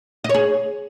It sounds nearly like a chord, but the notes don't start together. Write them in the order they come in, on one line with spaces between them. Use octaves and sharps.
D#5 C#5 G#4